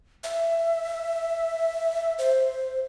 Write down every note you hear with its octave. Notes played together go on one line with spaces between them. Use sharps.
E5
C5